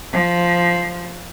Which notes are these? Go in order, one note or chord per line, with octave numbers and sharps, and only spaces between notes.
F3